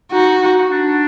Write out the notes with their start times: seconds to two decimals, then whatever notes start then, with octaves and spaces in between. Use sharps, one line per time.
0.13 D#4 F#4
0.42 D#4
0.71 D4